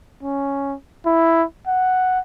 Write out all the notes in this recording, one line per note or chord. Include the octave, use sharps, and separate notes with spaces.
C#4
E4
F#5